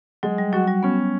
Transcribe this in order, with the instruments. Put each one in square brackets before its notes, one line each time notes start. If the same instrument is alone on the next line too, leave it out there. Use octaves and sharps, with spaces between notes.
[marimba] F#3 [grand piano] G#3
[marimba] G3
[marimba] F#3 [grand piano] F#4
[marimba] G3
[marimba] B3 [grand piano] C#4